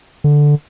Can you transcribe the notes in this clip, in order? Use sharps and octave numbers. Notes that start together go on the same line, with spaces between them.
D3